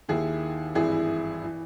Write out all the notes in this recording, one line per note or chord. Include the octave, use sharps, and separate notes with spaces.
D#2 D#3 E4 G#4
G#1 G2 E3 E4 G#4
E4
E3